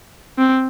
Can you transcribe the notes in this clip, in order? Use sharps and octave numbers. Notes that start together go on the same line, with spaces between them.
C4